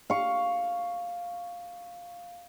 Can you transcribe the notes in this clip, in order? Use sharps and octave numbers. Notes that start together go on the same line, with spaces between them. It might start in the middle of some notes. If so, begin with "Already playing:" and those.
F5 C#6